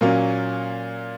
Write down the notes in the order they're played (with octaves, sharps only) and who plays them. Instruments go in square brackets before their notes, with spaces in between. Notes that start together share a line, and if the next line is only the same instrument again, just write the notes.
[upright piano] A#2 F#3 A#3 C#4